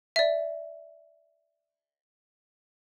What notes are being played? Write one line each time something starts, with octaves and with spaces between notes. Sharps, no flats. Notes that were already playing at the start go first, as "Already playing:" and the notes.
D5 E5